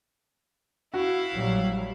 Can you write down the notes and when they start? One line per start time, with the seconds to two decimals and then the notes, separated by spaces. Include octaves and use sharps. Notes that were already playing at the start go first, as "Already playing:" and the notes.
0.94 E4 F#4 F5
1.33 A#1 F#3 G3